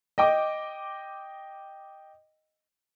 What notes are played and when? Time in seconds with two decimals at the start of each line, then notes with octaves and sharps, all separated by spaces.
0.18 D#5 G5 D6